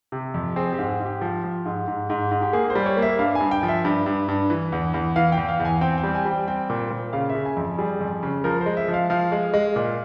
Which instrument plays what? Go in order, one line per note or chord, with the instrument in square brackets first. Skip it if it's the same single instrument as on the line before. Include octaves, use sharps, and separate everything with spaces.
[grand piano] C3
F2
C4 G#4
G4
G#2
G#4
G#2
G4
F3
F3
G#2
G#2
G#2
G#2
G4
A#3 G#4
C5
G3
C#5
A#3
E5
G2 F5
G#5
G2
G5
F3
E5
G2
G2
G2
E3
E2
E2
E3 F5
G5
E2
F5
E2
G#5
C4 G5
G5
G3
G#5
G3
G5
C4 G5
A#2
A#2
C#3 F5
E5
C#3
G#5
F2
G3 G#4
F2
C#3
F3 A#4
C5
G#3
E5
F3
F5
F3 F5
G#3
G#3
A#2